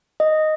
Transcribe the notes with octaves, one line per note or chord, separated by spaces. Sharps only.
D#5